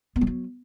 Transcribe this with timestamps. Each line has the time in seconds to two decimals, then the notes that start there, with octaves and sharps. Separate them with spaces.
0.16 B3
0.21 G3
0.27 F#3